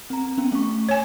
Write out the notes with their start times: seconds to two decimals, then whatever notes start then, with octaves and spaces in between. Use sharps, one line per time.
0.10 C4 A#5
0.38 B3 C#4
0.52 A3 C#6
0.89 C#5 G#5